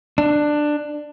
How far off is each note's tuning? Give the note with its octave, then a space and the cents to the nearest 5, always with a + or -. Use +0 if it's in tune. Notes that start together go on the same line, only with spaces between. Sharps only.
D4 +15